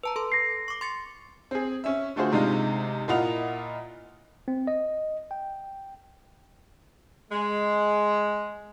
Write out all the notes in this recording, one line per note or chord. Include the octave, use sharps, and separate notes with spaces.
B4 A5 A#5
A4 C6
A#6 C7
C#6 D6
C6 A6 C#7
C4 G#4
C#4 E5
D3 A3 F4 F#4 G#4 C5
G#2 C3 G#3 D4 D#4 F4
A#2 E4 F4 D#5 F#5 F7
C4
D#5
G5
G#3